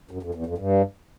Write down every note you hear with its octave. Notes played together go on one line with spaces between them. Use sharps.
F#2
F2
E2
F2
G2